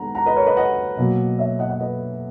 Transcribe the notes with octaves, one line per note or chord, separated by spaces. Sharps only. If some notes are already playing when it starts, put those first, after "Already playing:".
Already playing: D#3 G#3 B3 F#5 A#5
F#5 A#5
B4 D#5
A#4 C#5
B4 D#5
D#5 F#5
B2 F#3 A#3
C#5 E5
D#5 F#5
D#5 F#5
B4 D#5